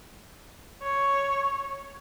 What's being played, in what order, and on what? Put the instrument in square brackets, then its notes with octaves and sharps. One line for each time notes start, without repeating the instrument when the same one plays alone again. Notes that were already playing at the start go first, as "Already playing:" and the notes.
[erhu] C#5